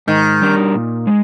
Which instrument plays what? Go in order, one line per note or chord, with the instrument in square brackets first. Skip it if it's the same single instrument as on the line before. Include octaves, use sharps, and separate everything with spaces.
[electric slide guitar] G#2 [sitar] D#3
[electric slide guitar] G3 D4 G4 A#4
A#2
G#3